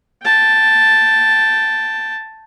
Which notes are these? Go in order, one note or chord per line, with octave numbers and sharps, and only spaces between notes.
G5 A5